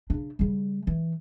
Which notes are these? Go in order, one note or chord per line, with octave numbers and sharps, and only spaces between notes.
C#3 D4
C#3 G3
E3